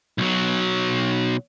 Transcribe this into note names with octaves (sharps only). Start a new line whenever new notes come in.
B1 F#3